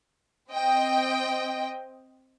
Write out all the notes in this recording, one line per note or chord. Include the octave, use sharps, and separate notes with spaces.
C4 D#5 G5